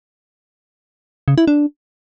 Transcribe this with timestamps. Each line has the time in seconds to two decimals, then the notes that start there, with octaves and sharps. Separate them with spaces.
1.28 C#3
1.38 E4
1.47 D4